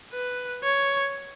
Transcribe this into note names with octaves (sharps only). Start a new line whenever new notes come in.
B4
C#5